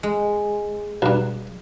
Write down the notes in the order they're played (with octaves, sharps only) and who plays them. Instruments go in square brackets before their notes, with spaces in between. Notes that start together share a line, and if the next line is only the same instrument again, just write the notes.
[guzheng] G#3
[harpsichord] B1 G2